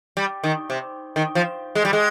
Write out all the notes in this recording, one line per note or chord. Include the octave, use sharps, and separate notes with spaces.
G3
D#3
C3
D#3
F3
G#3
G3
G#3